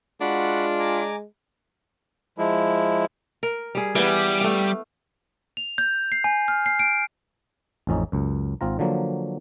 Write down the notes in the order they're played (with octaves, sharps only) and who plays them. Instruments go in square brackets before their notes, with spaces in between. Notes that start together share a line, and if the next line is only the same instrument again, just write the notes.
[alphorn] G#3 [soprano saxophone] D4 [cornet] F4 [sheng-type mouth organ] F#4 F#5 B5
[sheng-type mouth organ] G#5 A#5 D6
[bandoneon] F3 G#3 E4
[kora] A#4
G3 G#4
[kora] E3 B3 [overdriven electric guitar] G3
[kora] A3 F5
[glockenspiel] F7
G6
C7
G#5
F6
C7
D7
[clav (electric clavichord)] A1 F2 C#4 D#4
C#2 F#2
G#1 C4 F4 A#5
D3 F3 F#3 A#3